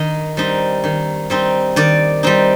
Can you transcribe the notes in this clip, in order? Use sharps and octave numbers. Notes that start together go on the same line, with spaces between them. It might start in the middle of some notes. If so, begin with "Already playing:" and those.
Already playing: D#3 D#5
G3 C4 D#4
D#3
G3 C4 D#4
D#3 D5
G3 C4 D#4